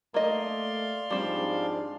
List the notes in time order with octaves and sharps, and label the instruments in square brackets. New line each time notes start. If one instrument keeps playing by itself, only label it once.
[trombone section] A3 [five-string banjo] A#3 D#5 [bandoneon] D5 F5 C6
[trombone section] G#2 F3 D4 [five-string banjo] G3 C4